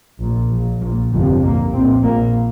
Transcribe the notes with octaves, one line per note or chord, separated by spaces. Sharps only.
A#1 A#2
A#1 A#2
A#1 A#2 A#3
G1 F2 C3 G3
C2 A#2 A#3
A#1 A#2 C4
A#1 A#2 A#3